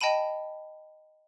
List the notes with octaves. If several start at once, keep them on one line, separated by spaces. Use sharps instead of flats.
D#5 G5 A5 B5 D#7